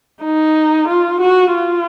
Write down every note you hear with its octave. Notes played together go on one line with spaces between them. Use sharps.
D#4
F4
F#4
F4